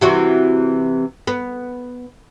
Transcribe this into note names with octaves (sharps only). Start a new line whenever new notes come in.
C3 E3 F#4
B3